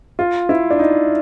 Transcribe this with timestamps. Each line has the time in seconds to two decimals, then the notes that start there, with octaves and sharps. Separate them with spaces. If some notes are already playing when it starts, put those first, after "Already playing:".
0.19 F4
0.49 E4
0.70 D4
0.79 D#4